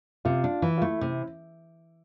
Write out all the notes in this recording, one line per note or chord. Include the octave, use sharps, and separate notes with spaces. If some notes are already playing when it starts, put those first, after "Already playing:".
C3 F4
D4
E3
F4
A3 E4
C3